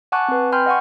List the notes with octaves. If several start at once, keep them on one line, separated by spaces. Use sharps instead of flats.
F#5 G#5 A5 C#6 D6 F#6
C4 B4
G5 G#5 B5 C6 F6 G6
D#5 F#5 G#5 C#6